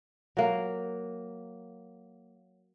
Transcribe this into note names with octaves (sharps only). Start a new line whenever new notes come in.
F#3 A#3